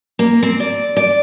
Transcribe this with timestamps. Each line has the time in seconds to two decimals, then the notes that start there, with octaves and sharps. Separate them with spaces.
0.19 A#3
0.43 C4
0.60 D5
0.97 D5